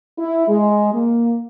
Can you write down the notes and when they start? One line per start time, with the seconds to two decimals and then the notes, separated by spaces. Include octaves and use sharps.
0.18 E4
0.48 G#3
0.94 A#3